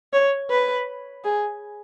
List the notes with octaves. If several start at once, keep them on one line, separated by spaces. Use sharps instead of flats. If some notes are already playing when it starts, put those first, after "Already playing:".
C#5
B4
G#4